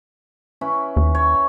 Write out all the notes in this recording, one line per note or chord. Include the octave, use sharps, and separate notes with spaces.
C#4 E4 B4
D#2
C#5